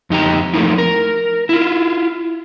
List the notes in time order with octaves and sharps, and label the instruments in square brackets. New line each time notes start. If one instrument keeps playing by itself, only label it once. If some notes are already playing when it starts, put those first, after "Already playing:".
[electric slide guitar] F2 D#4 G4 A#5
F3 A3 A#3 C4 D#4 E4
A#4
E4 F4